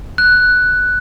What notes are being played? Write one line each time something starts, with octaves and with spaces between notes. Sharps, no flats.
F#6